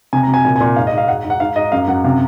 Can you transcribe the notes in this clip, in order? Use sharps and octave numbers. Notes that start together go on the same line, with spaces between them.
C3 G#5
A#5
C3
G#5
A#2 G#5
G#5
A#2
G#2 F5
D#5
G#2
F5
G#2 F#5
G#2
F#5
G#2 F5
G#2 D#5
F#2 F5
F#2 F#5
C3 F5